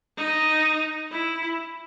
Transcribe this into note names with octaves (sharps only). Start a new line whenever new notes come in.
D#4
E4